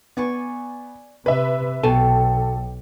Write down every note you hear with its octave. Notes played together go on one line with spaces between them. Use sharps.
B3 D5 G#5 C#6
C3 B4 E5 B5
B1 B2 G4 A4 G#5 A5